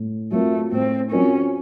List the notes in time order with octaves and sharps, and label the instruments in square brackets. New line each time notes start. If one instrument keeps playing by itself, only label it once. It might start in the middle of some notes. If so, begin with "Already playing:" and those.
Already playing: [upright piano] A2
[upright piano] F#3 C4 F4 A#4 [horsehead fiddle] A3
[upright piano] A2 [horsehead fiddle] C4
[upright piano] F#3 C4 F4 A#4 [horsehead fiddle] C#4